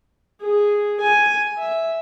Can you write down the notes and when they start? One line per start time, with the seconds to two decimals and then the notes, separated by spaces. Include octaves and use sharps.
0.41 G#4
1.00 G#5
1.57 E5